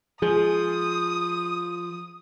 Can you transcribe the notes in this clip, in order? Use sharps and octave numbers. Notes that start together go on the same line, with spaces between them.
F3 G#4 D#6